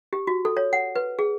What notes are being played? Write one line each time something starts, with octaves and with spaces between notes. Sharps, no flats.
G4
F#4
A4
C#5
F#5
B4
G#4